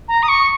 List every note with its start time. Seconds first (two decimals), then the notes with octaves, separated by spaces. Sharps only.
0.08 A#5
0.23 D#6
0.29 C#6